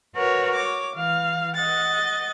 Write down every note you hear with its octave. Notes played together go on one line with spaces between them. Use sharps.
F#4 A#4 B4 C#5
C#5 D6
E3 F5
D#5 F#5 A6